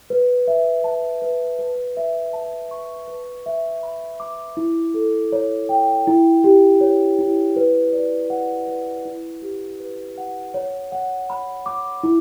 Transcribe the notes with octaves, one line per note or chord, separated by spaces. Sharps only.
B4
E5
A5
B4
B4
E5
A5
C#6
B4
E5
B5
D6
E4
A4
C#5
G5
E4
G4
C#5
E4
B4
D5
F#5
B4
E4
G4
B4
F#5
C#5
F#5
B5
D6
E4